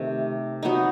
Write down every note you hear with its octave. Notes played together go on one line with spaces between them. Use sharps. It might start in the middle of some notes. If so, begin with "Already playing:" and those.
Already playing: C3 D#3 A3
F#3 B3 D#4